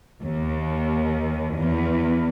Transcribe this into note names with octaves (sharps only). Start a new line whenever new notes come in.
D#2
E2